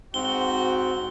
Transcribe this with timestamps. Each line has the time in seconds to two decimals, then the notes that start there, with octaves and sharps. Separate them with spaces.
0.14 G#2 C4 F#4 G7